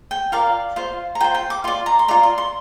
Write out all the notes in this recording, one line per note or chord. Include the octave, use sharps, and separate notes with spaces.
G5
F4 A#4 D5 F5
F4 C5
A#5
F4 C5 G5
G5
D6
F4 D5 C6
A#5
C6
F4 D5 A#5
C6
C6